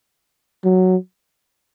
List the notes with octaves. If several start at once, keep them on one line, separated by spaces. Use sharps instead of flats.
F#3